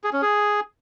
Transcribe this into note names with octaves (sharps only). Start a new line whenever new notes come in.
G#4
C#4
G#4